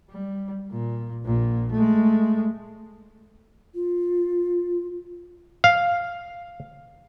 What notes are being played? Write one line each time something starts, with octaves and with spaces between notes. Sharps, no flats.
G3
A#2
A#1 A#2
G#3 A3
F4
F5